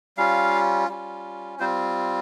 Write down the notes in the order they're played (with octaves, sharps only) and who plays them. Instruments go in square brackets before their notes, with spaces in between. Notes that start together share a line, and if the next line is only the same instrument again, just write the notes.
[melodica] G3 C#4 F4 F5
G3 C#4 F4
G3 C4 F4 C5